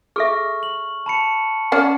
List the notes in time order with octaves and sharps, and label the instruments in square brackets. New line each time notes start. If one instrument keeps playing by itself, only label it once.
[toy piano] G#4 A4 E5 [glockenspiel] C#6 F6
[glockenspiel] F#7
A5 B5 C#7
[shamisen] C#4 D5 [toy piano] F#5